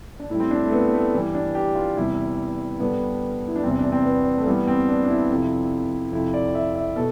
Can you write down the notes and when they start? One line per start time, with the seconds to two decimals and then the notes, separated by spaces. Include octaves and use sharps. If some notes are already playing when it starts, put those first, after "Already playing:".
0.20 D4
0.30 A2 G3 E4
0.40 C4
0.51 D4
0.66 A3
0.72 B3
0.93 A3
1.13 G2 E3 G3
1.35 D4
1.55 G4
1.75 F4
1.97 E2 C3 G3 E4
2.80 G2 D3 G3 B3
3.47 E4
3.56 D4
3.63 E2 C3 G3 C4
3.79 D4
3.92 C4
4.05 B3
4.37 A3
4.46 G2 E3 G3 B3
4.68 C4
4.88 D4
5.03 D4
5.09 E4
5.30 F2 C3 F3
6.12 F2 C3 F3 E4
6.34 D5
6.55 E5
6.76 E5
6.96 B2 A4